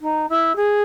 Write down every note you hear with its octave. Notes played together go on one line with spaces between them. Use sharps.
D#4
E4
G#4